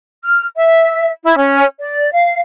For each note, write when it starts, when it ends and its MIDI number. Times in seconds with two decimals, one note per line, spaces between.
0.24 0.46 89
0.56 1.11 76
1.23 1.36 64
1.37 1.64 61
1.80 2.11 74
2.13 2.40 77